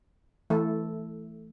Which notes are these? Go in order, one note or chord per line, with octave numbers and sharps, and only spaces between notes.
E3 A3 E4 A4